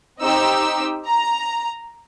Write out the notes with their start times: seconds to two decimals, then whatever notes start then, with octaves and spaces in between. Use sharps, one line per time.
0.20 C4 D#4 G4 E6
1.07 A#5